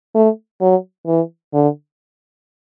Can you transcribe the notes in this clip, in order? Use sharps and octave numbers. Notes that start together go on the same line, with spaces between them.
A3
F#3
E3
D3